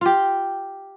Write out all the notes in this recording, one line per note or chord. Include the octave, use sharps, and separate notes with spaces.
F4 G4